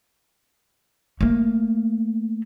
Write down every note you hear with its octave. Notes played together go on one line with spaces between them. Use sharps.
A3 A#3